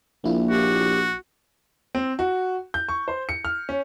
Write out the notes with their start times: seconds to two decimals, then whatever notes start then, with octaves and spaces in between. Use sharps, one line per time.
0.24 A#1 A#3 E4 F4
0.50 F#4 G4
1.95 C4
2.19 F#4
2.74 G6
2.89 C#6
3.08 C5
3.29 C#7
3.45 F6
3.69 C#4